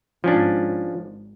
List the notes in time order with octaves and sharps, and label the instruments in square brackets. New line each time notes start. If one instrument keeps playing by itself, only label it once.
[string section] G#1 [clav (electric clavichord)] F3 C#4 D4